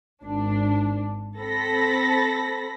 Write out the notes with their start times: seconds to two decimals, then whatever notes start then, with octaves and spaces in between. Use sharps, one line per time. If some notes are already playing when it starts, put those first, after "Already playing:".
0.22 G#1 D4
1.39 C4 A4 B5 A#6 B6